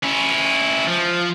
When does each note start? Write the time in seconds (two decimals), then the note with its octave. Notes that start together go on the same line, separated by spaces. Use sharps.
0.04 C#4 E4
0.87 F3